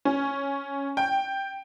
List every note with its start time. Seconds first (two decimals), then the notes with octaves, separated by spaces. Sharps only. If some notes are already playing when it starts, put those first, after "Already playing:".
0.05 C#4
0.97 G5